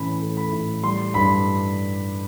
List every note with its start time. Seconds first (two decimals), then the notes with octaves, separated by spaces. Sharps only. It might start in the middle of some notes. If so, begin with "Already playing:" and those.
Already playing: A2 E3 A3 C#4 B5
0.22 A3
0.37 B5
0.53 A2
0.83 G3 C6
1.14 G2 B5